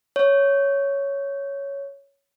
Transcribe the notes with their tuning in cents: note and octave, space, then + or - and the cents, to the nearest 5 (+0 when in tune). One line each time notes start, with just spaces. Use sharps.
C#5 +5